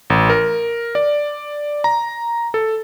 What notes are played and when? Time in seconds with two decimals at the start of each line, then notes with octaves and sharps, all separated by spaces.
0.10 A1
0.30 A#4
0.95 D5
1.84 A#5
2.54 A4